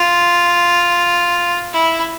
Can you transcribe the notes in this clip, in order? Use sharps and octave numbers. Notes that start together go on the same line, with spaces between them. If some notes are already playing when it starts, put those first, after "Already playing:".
Already playing: F4
E4